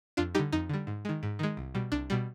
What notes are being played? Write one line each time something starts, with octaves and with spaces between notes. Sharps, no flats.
F2 D4 F4
D3 G3 D#4 G4
F2 D#4
D3 G3
G#2
D#3 G#3
G#2
D#3 G#3
C2
B2 G3
C2 D4
B2 G3